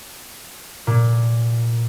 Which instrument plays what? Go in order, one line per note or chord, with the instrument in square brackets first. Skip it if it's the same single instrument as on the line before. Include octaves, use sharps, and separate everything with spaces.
[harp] A#2